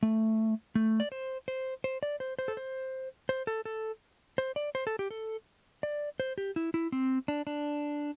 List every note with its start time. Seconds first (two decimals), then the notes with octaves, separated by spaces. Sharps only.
0.03 A3
0.75 A3
1.00 D5
1.12 C5
1.48 C5
1.84 C5
2.03 D5
2.20 C5
2.39 C5
2.48 A4
2.57 C5
3.29 C5
3.47 A4
3.65 A4
4.38 C5
4.56 D5
4.75 C5
4.87 A4
4.99 G4
5.11 A4
5.83 D5
6.20 C5
6.38 G4
6.56 E4
6.74 E4
6.92 C4
7.28 D4
7.47 D4